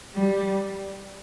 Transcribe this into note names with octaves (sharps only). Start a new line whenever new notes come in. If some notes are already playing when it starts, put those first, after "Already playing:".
G3